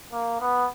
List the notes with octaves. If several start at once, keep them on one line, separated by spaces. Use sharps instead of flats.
A#3
B3